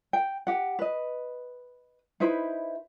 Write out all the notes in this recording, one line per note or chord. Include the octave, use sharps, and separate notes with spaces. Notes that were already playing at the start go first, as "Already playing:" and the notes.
G5
G4 F#5
B4 D#5
D#4 E4 B4 C5